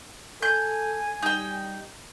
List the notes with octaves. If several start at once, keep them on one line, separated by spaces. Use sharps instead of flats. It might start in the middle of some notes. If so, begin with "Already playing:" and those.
A4 G#5 G6
G3 D#4 G5